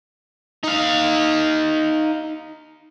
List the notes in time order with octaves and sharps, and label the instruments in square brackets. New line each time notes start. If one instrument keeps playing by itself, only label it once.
[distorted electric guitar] D#4 F5